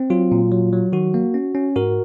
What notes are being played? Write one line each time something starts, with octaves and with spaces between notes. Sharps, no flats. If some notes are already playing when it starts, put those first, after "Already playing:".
Already playing: C4
F#3 F4
A#2
F#3
F#3
D#3 F#4
A#3
C#4
C#4
G#2 F#4 A#4